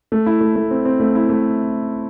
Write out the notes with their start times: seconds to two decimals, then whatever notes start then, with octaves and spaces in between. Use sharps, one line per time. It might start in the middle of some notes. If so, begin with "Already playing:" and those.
0.12 A3
0.26 E4
0.41 A3
0.56 A3
0.71 C4
0.85 C4
1.00 A3
1.15 E4
1.29 A3